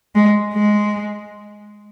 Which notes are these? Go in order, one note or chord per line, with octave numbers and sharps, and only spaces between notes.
G#3
G#3